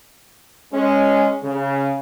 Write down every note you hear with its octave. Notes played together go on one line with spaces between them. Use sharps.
G#3 C#4
C#3